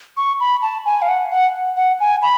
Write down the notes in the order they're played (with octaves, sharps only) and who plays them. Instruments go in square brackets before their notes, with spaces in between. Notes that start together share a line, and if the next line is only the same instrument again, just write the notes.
[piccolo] C#6
B5
A5
G#5
F5
F#5
F#5
F#5
G#5
B5